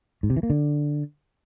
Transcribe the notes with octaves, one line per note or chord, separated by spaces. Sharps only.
G#2
C3
E3
A#3
D3